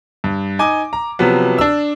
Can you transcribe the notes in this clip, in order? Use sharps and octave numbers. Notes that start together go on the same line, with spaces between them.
G2
D#4 G#5 D6
A#5
C3 F3 F#3 B3
D4 E6